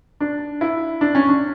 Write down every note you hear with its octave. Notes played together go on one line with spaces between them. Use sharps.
D4
E4
D4
C#4
D4